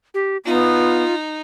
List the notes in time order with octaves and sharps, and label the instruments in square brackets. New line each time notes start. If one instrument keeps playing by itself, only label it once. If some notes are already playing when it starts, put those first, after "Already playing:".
[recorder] G4
[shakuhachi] B3 [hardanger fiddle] D#4 [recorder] F4